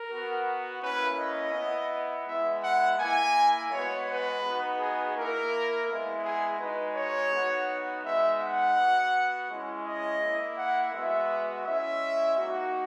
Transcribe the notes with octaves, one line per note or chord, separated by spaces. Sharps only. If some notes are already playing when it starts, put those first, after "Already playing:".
Already playing: A#4
B3 F#4
A#3 C#4 E4 B4
D#5
B3 E4
G#3 B3 E4 E5
F#5
A#3 E4 G#5
G#3 B3 F#4 C#5
B4
B3 D#4 F#4
G#4
A#3 E4 A#4
G#3 B3 E4
G#4
G#3 D#4 F#4 B4
C#5
B3 D#4 F#4
G#3 B3 D#4 E5
F#5
B3 F#4
G#3 C#4 E4
D#5
A#3 E4
F#5
G#3 B3 F#4 E5
G#3 C#4 E4 E5
A#3 D#4 F#4